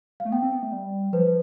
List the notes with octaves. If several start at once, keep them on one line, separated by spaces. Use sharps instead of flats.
F5
A3
B3 G5
C4
B3
A3
G3
F3 B4
B4